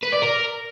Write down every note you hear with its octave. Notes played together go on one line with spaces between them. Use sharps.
B4
D5
A#4